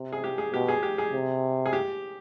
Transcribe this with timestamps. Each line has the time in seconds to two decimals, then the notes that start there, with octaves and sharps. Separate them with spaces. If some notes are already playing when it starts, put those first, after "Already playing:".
Already playing: C3
0.13 G#4
0.24 G4
0.38 G#4
0.53 B2 G4
0.68 G#4
0.83 G4
0.98 G#4
1.13 C3
1.66 G#4
1.73 G4